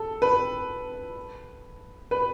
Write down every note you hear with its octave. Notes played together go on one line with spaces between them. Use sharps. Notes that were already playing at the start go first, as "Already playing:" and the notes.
Already playing: A4
B4
B4